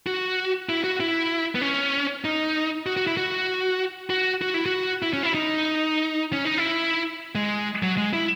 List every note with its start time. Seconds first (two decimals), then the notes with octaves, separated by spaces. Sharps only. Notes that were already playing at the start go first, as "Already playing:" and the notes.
0.07 F#4
0.69 E4
0.84 F#4
1.00 E4
1.55 B3
1.61 C#4
2.24 D#4
2.86 F#4
2.97 F#4
3.07 E4
3.17 F#4
4.10 F#4
4.42 F#4
4.54 E4
4.66 F#4
5.02 E4
5.13 C#4
5.23 E4
5.34 D#4
6.33 C#4
6.45 D#4
6.58 E4
7.35 G#3
7.83 F#3
7.98 G#3
8.13 E4